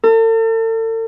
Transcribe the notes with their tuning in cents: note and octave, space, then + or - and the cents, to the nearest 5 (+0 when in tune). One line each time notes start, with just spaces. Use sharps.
A4 +40